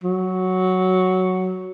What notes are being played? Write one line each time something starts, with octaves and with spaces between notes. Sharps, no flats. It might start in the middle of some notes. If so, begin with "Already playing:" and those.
F#3